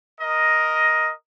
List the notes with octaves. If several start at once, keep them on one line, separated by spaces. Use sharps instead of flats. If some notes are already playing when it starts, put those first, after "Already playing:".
A#4 D#5